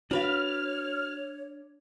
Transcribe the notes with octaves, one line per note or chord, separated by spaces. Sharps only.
D4 F#4 B4 C#5 F5 F6